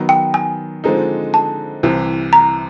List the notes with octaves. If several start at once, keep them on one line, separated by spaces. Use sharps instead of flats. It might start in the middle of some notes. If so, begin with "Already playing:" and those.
Already playing: D#3 F#3 B3
G5
G#5
D3 F3 G#3 C4 D#4
A5
C2 C3 E3
A#5